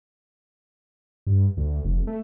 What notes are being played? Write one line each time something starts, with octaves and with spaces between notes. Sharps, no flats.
G2
D2
F1
A3